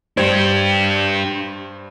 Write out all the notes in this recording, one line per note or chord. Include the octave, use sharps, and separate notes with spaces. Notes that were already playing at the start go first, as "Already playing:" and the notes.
G2 D4 G4 C5 G#6